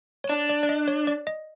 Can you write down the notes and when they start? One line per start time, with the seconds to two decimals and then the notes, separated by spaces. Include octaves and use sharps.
0.24 C#5
0.29 D4 D5
0.49 D5
0.63 D5
0.69 D#5
0.88 C#5
1.07 D5
1.27 D#5